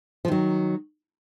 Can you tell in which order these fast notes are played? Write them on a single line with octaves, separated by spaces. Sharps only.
F3 D#3 F#3